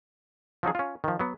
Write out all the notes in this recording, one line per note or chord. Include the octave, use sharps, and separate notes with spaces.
F3 F#3 D#4 G#4
C#4 F4
D#3 F3
F#3 B3